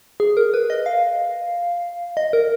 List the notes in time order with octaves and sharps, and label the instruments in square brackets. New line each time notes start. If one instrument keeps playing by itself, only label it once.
[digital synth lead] G#4
A#4
B4
D#5
F5
D#5
A#4